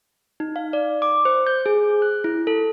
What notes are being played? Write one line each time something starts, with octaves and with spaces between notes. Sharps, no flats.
D#4
F5
D5
D6
C5
G6
G#4
F#6
E4
A4